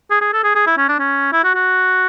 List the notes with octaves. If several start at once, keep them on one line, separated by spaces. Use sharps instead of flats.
G#4
G#4
A4
G#4
G#4
E4
C#4
D4
C#4
E4
F#4
F#4